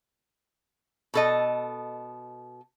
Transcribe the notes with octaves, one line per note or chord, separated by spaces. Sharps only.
B2 A4 D#5